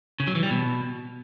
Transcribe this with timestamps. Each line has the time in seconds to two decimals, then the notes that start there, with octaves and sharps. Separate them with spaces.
0.20 C#3
0.27 F#3
0.35 E3
0.43 G3
0.51 B2